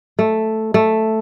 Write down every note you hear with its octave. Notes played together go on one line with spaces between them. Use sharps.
A3
A3